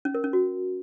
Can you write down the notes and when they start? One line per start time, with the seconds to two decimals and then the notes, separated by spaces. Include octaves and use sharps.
0.05 C#4
0.14 A#4
0.24 C#4
0.33 F#4